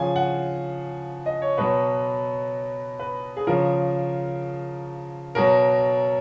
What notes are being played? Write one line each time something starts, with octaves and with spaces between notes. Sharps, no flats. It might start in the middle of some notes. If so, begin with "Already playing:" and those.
Already playing: C#3 F3 G#5
F#5
D#5
C#5
B2 F#3 B4
B4
G#4
C#3 F3 A#4
B2 F#3 A#4